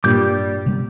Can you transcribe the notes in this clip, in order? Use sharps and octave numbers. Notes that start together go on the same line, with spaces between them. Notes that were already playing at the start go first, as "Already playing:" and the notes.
G2 A#2 G3 D6 G6
C3 G3 B3